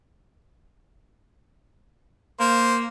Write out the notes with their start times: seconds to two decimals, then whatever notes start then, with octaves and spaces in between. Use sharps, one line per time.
2.40 A#3 C5